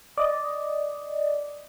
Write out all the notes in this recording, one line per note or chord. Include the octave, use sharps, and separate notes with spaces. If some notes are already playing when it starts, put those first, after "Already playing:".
D5 D#5